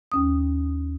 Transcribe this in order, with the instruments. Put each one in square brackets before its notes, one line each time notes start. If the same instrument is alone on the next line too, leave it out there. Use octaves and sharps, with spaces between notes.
[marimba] D#2 C#4 D#6